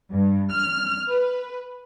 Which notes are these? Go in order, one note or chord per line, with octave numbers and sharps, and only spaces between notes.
G2
F6
B4